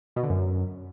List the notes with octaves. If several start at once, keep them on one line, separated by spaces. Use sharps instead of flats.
B2
D3
F#2